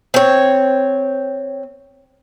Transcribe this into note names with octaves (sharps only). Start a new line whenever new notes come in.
C4 C#5